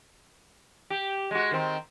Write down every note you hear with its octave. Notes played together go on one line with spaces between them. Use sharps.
G4
G#3 F#4
D#3 C4